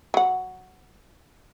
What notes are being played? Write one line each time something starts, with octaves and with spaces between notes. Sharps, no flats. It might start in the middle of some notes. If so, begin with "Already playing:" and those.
F#3 F#5